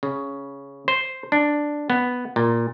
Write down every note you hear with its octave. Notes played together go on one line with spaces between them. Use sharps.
C#3
C5
D4
B3
A#2